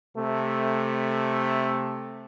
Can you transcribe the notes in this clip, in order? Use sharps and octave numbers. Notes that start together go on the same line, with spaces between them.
C3 A3